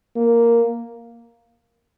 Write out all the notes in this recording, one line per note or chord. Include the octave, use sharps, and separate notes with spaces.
A#3